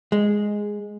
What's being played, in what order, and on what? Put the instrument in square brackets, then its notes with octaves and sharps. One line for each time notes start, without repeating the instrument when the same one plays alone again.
[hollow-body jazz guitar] G#3